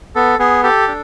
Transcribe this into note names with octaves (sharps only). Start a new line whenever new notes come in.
B3 A4
B3 G#4
G4 A4
D4